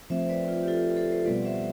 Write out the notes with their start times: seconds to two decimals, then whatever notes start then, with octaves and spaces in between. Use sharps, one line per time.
0.10 F3 A3 C4 C5 E5
0.29 B4 D5
0.48 F4
0.63 G4
0.68 F4 A4
0.96 A4 C5
1.11 A4 C5
1.25 B2 G3 B3 F4 B4 D5
1.45 C5 E5